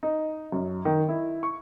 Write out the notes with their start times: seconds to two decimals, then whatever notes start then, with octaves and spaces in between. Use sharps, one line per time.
0.03 D#4
0.52 F#2
0.85 D#3
1.09 E4
1.43 C#6